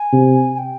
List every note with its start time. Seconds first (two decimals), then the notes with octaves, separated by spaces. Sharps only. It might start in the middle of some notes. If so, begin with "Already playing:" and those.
Already playing: G#5
0.13 C3
0.54 G#5
0.58 G5